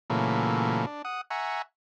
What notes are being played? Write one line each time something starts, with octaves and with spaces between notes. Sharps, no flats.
A#2 C#3 E3 F#3 A3 A#3
D4
F#5 D#6
E5 F#5 G#5 A#5 C#6